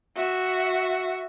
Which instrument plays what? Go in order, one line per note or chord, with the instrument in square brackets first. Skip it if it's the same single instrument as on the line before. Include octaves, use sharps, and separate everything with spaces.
[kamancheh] F#4 E5